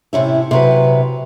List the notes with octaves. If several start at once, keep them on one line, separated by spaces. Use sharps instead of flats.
A2 C3 C#4 E4
C3 F#3 B4